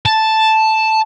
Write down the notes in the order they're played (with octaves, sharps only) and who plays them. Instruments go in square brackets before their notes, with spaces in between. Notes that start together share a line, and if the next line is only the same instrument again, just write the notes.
[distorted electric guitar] A5